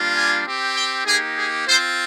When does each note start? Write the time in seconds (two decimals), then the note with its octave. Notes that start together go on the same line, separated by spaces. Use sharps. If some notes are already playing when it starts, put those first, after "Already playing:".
Already playing: G3 A#3 D4 F4
0.14 G#5
0.45 C4 G4
0.76 G5
1.06 A#3 D#4 G4 G#4
1.37 G#4
1.67 C4 F4 C5